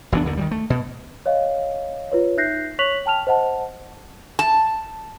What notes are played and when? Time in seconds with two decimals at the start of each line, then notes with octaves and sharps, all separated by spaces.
0.12 F#1 E3 B3 D4
0.25 D#2 D3 D#3
0.37 D#3 F3 G3
0.51 A3
0.70 B2
1.26 C#5 D#5 F5
2.12 F4 B4 C#5
2.37 D#4 E5 F#6 G6 A#6 C7
2.79 C#5 C#6 F#6 B6 F7 F#7
3.06 G5 A5 F6 F7
3.27 C5 D#5 F#5 A5
4.39 A5